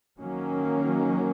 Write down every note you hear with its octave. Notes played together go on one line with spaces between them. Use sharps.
D#3 F#3 A#3 C#4